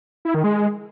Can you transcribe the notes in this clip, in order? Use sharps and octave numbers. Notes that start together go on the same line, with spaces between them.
E4
D#3
G#3